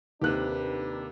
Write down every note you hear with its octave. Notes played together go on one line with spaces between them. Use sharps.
D#2 C3 D#3 D4 G4 A4 B4 F#6